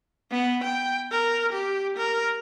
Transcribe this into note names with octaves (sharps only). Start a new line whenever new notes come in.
B3
G5
A#4
G4
A#4